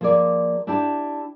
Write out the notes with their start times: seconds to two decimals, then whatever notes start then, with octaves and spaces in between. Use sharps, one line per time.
0.01 F3 A#3 G#4 C#5 D5
0.67 D4 E4 G4 G5 A5